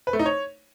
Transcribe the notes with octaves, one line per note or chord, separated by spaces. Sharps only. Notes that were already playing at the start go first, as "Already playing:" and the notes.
B4
A3
D#4
C#5